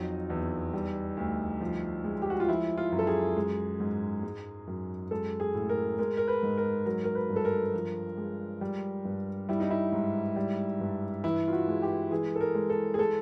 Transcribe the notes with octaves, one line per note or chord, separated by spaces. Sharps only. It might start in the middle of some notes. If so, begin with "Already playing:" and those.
Already playing: F2 F#3 D#4
E2
G3
D2
F3
G#3
G4
F#4
F4
F3 E4
F4
F#2
A4
G#4
G#3
G#2
G#3
F#2
G#3 A4
G#4
A2
A#4
G#3 A#4
A#4
B4
G#2
A#4
F#3 A#4
A#4
B4
G2
A4
A#4
F3
G#3
G3
G2
G3 E4
D#4
E4
G#2
G3
G2
E3 E4
F4
F#4
G#3
G4
E3 G#4
A4
A#4
G#3
A4
G#4
G#3 A4